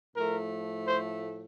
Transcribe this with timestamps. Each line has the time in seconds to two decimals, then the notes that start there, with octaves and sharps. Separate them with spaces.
0.16 A2 F3 A3 A#4
0.87 C5